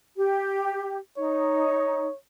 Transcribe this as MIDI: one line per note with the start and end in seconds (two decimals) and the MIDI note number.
0.16 0.98 67
1.18 2.07 63
1.18 2.16 73